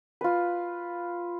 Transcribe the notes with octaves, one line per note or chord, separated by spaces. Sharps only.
F4 B4